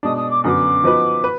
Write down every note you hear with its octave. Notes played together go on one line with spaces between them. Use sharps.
B2 G#3 D4 D#6
D#6
D6
F#2 D3 F#3 B3 D6 D#6
F3 B3 D#4 F#4 B4
B4